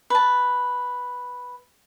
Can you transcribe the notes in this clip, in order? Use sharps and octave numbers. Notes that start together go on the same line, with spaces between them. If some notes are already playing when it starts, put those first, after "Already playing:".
B4 A5